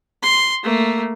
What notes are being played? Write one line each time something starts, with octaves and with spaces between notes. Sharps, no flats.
C6
A3 A#3